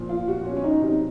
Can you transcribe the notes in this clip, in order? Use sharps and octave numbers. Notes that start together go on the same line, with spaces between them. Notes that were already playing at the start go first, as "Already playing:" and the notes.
Already playing: A#2 F3
F4
F#4
C#4
C#4
D#4
C3 F#3 D#4